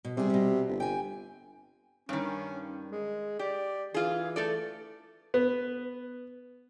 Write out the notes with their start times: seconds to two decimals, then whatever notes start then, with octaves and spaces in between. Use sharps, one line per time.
0.05 B2
0.17 C3 G3 G#4
0.30 B2 G3
0.68 G1
0.80 G5 G#5
2.09 G2 D#3 C#4
2.92 G#3
3.39 G4 D5
3.94 E3 F4 G#4
4.36 A3 A4 D5
5.34 B3